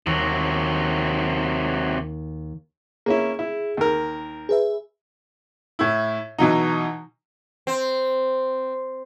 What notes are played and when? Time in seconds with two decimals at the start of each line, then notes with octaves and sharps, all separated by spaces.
0.07 D#2 C3 F#3
3.06 A#3 C#4 E4 G#4
3.39 E4
3.77 D#2 A#4
4.49 G#4 B4 E5
5.79 A2 E4
6.39 B2 E3 F#3 D#4
7.67 C4